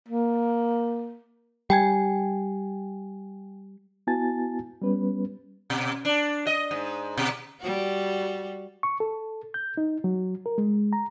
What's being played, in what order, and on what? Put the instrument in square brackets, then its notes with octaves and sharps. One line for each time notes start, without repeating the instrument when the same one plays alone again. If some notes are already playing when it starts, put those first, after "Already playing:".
[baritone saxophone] A#3
[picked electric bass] G3 [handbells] G5 G#5 G#6
[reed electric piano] B3 E4 F#4 G#5 A5 A6
G3 B3 C#4 B4
[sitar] B2
D4
D#5
G#2
B2
[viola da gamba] G3 F#4
[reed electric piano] C#6
A4
G6
D#4
F#3
A#4
G#3
A#5